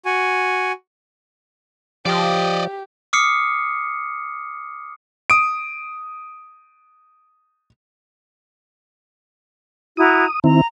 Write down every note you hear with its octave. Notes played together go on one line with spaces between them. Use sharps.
F#4 G#5
F3 G4 D5 D#5
D6 D#6 F6 C7 C#7
D#6 D7
E4 F#4 A#5 D#6
D#3 C4 E4 A#5